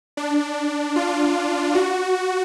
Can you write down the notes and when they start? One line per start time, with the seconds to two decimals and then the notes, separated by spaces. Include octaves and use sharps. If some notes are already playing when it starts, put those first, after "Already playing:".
0.17 D4
0.96 F4
1.75 F#4